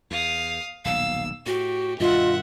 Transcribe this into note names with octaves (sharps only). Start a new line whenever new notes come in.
E2 F5 D#6
D#1 B1 F5 E6
A2 F#4 G4
G2 B2 D#3 F4 D#5 E5 F#5